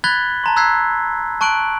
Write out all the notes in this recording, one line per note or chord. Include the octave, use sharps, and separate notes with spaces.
B5 F#6 G#6 A6 B6 G7
A5 A#5 C6
A#5 E6 F#6 G#6 B6 C7
A5 C#6 F#6 D7 F#7